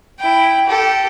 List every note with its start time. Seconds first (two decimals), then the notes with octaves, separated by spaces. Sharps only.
0.19 E4 G5
0.66 G4 A4